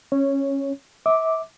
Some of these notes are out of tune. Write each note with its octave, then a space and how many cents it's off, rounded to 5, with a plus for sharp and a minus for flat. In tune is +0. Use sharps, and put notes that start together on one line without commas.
C#4 -15 C#5 +0
E5 -35 D6 +0